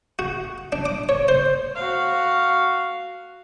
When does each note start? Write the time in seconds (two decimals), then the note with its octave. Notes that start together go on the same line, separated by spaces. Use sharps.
0.19 F#4
0.72 D4
0.86 D6
1.09 C#5
1.28 C5
1.76 F#4 F5